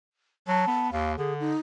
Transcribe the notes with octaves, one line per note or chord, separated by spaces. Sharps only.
F#3 A5
B3
D#2 F5
D3 G#4
D#4